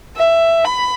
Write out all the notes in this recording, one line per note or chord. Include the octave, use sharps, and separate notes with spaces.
E5
B5